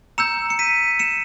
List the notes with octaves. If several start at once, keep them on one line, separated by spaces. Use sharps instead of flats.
A#5 E6 G6 C#7 E7
C#7
B6 D#7
C#7 E7